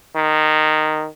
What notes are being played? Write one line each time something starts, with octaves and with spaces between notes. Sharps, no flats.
D#3